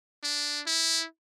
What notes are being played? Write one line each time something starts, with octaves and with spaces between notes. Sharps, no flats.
D4
E4